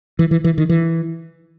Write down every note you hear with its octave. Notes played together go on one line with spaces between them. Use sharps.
E3
E3
E3
D#3
E3